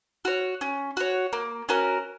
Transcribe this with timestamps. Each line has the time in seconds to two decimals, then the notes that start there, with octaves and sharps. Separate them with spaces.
0.25 F#4 C#5
0.61 C#4
0.97 F#4 C#5
1.33 A#3
1.69 C#4 F#4 A#4